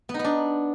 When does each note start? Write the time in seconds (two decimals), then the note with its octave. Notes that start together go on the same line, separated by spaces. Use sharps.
0.09 B3
0.14 D#4
0.19 B3
0.24 D4